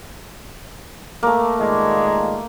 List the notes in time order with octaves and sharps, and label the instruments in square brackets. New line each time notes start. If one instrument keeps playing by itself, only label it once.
[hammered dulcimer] A3 A#3
[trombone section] A#2 D#3 G#3